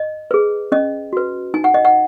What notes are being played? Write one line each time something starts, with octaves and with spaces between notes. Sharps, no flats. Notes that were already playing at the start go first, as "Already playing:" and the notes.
Already playing: D#5
G#4 B4
C#4 D#5
F#4 B4
D#4 G#5
F#5
D#5
F#5